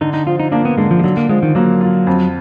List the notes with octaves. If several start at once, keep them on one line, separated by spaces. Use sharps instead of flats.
D3 D#4
D#4
F3 F4
D#4
A#3 D4
B3
D3 G#3
F3
G#3
D3 F#3
A#3
F3 G#3
D#3
F#3 A#3
F4
F2